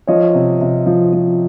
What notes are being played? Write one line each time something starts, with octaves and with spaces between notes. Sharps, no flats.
F3 C#5 D#5
C3
C3
F3
F3